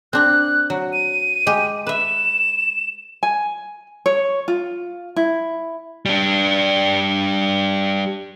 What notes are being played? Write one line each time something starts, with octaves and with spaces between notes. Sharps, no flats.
C4 D4 A#5 F#6
F#3
D#7
G#3 G4
B4 E5 E7
G#5
C#5
F4
E4
G3 D4